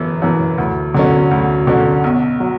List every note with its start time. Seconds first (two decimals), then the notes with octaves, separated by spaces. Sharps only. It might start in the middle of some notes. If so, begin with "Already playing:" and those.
Already playing: G1 F#2 E3
0.22 F#2 E3
0.58 D2
0.94 D3 F#3 C#4
1.31 D2
1.67 D3 F#3 C#4
2.04 B1
2.40 F#3